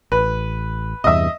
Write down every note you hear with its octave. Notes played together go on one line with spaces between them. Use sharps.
A1 B4
E2 G2 C3 D#5 E5